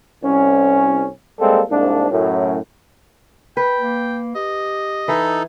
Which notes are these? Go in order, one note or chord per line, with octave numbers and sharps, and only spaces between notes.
C2 C#4
G3 G#3 A#3 C4 A4
C2 G#2 A#3 D4
F#2 A2
B4 G5
A#3
G4 D#5
E3 D#4 A4